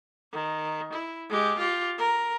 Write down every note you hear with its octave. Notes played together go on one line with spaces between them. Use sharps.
D#3
E4
G#3 G4
F4 G4
A#4